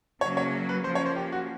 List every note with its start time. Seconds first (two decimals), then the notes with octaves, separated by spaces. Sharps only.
0.21 C#3 F#3 A#3 C#4 C#5
0.37 C#5
0.69 B4
0.84 F3 A#3 C#4 C5
0.95 C#5
1.06 C5
1.16 G4
1.32 F#4